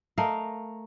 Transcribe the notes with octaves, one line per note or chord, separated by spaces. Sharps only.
A3 A#4 D#5 F5